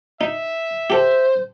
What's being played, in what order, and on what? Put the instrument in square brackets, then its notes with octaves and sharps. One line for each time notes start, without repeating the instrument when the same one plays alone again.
[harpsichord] D#4 [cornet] E5
[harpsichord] G4 A4 [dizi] C5